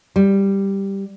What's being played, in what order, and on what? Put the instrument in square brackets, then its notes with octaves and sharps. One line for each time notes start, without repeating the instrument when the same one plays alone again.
[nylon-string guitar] G3